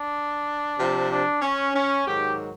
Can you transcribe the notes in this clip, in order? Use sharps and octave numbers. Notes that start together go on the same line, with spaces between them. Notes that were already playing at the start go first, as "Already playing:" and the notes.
Already playing: D4
C3 F3
D4
C#4
C#4
G#2 D#3 F#3 G4